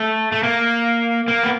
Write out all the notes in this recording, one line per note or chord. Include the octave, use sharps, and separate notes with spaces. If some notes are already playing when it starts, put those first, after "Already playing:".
Already playing: A3
A3
A#3
A#3
B3